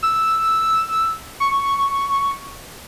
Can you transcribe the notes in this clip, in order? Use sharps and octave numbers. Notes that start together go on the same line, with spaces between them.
E6
C#6